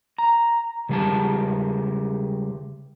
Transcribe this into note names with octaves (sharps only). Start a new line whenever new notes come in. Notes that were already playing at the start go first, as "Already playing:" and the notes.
A#5
C#3 G3 G#3 G4 A5